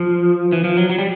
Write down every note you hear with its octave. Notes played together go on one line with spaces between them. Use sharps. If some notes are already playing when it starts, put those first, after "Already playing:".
Already playing: F3
E3
F3
F#3
F#3
G3